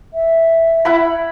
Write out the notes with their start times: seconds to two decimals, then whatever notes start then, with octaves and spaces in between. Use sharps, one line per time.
0.14 E5
0.85 E4 F#5 B5